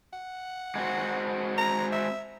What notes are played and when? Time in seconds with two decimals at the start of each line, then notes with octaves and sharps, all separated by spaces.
0.13 F#5
0.75 G#3 C4 F#4
1.58 A#5
1.92 E5